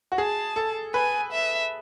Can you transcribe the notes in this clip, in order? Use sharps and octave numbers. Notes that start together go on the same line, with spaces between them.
F#4
G#4 A5
A4
B4 G#5
E5